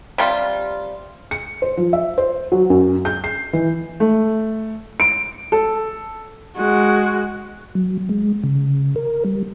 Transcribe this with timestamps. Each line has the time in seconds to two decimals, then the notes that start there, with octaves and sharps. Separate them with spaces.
0.18 C3 G3 F4
1.31 C#7
1.62 C5
1.77 F3
1.93 E5
2.18 C5
2.52 F#3
2.70 F#2
3.05 G6
3.24 C7
3.53 E3
4.00 A3
5.00 D7
5.52 A4
6.57 G#3 F#4
7.75 F#3
8.09 G#3
8.44 C#3
8.96 A#4
9.24 G3